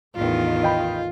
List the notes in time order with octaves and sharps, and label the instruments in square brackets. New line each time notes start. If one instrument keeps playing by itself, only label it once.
[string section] A1 E2 D#3 [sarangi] F4
[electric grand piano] D#5 G5 B5